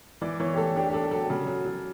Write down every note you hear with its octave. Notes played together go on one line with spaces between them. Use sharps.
E3 D5
E3 C#5
G4
A3 A4
D4 G4
G4
D4 A4
G4
F#3 A4
C#3
F#3
F#3